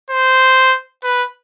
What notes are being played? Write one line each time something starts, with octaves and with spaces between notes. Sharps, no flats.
C5
B4